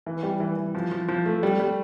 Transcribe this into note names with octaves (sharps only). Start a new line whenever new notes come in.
E3
G3
E3
E3
F3
F3
F3
A3
G3
G3